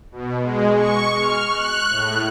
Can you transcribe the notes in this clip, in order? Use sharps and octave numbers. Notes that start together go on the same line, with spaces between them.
B2
G#3
C#6
F6
F#6
A2